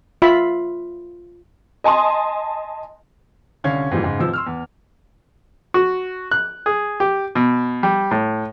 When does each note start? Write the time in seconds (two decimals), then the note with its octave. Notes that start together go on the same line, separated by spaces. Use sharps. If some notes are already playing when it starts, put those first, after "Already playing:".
0.22 F4 E5 B5
1.84 D#5 G#5 A5 C6 D#6
3.64 C2 D3 C#4 F5 G#6
3.91 G#2 B2 E3 F3 G3
4.04 G#2 C#3
4.19 A1 C3 F3 E6
4.33 C6 E6 F6
4.46 E2
5.74 F#4
6.31 F#6
6.66 G#4
7.00 G4
7.35 B2
7.83 G3
8.11 A2